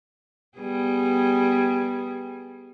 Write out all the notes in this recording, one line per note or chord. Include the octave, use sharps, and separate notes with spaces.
G3 B3 G#4